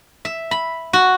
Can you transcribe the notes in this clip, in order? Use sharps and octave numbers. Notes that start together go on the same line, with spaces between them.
E5
B5
F#4